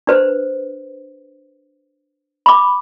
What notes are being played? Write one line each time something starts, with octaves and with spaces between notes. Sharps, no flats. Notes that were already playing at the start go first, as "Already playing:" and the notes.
D4 B4 C5
B5 D6